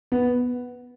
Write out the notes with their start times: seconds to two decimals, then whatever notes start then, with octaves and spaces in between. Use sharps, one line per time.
0.12 B3